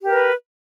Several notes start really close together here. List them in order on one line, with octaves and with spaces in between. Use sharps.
G4 A#4 B4